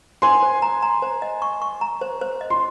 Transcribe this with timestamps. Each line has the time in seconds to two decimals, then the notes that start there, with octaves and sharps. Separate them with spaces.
0.22 C5 G#5 C6
0.42 C5
0.62 A#5
0.82 A#5
1.02 C5
1.22 D#5
1.42 C#6
1.62 C#6
1.81 A#5
2.01 C5
2.21 C5
2.41 D#5
2.50 C6